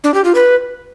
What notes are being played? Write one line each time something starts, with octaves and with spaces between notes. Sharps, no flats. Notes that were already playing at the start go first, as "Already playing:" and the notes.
D4
G4
F4
B4